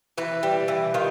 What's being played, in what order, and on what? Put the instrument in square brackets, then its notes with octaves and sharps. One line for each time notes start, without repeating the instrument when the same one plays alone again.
[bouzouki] E3 B4
G3
E3
D#3 F4